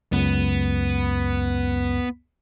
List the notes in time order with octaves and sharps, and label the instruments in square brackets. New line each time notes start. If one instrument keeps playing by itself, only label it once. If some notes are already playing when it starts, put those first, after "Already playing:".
[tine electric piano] C#2 F#2 [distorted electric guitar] B3